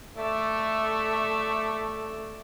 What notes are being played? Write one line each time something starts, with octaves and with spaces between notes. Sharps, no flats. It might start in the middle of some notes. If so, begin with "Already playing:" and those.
A3 D5 E5